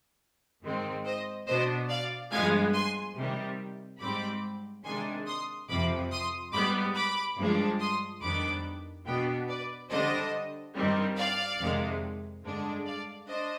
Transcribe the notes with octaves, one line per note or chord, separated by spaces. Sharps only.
G#2 D#3 G#3 C4
C5 D#5
B2 B3 D4 C5 D#5
D5 F5
G2 F3 G#3 B3 F5 G#5
G#5 C6
C3 D#3 G3
G#2 G3 C4 B5 D6
C3 D#3 G#3 D4 G#5 C6
C6 D#6
F2 C3 F3 B5 D6
C6 D#6
G#2 G3 B3 B5 D6
B5 D6
G2 F3 G#3 D4
C6 D#6
F2 D#3 G3 B3 D4 B5 D6
B2 B3 D4 G5 B5
B4 D5
D3 G3 D4 C5 D#5
G2 D#3 G3 C4
D5 F5
F2 C3 D#3 G#3
G2 D3 G#3 D4
D5 F5
D4 C5 D#5